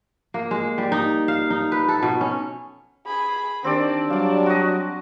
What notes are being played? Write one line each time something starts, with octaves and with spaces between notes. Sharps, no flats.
A#3
G#3
G3
D#4
F5
D#4
B4
A4
B2
C#4
G#4 B5
D#3 C4 D4 G4 D5
F#3 G3 D5 F5
F#4 D#5